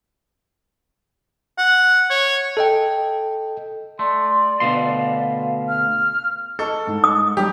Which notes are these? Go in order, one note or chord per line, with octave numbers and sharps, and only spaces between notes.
F#5
C#5
A4 D#5 G5
A3 D5 C6
D2 B2 F5 C6
F6
A4 D#5 C#6
G#2
D#6
F#3 G3 D4 G4